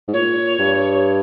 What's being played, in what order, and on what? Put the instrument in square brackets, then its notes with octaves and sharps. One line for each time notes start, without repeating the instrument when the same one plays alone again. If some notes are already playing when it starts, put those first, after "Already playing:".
[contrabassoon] G#2
[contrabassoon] A#2 [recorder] C#5
[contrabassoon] G2